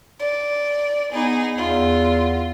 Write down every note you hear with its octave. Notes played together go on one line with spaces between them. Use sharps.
D5
B3 D#4 G#4
E2 F4